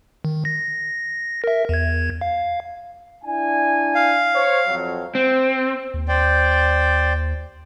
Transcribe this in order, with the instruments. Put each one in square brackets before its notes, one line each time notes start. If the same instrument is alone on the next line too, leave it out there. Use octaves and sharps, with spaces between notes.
[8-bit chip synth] D#3
A#6
A#4 E5
E2 G#6
F5
[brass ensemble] D4 E4 G#5
[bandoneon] F5
[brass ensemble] C5 C#5
F2 F#3
[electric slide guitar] C4
[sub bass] D#2
[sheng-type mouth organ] C5 D5 G5